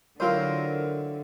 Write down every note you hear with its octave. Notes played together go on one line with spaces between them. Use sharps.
D3 F#3 C4 E4 F4 A#4 C5